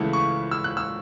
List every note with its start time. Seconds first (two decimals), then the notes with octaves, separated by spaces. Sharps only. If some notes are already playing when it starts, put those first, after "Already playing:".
Already playing: C#2 C#3 E3 A3 F#5
0.13 C#6
0.51 E6
0.64 F#6
0.77 E6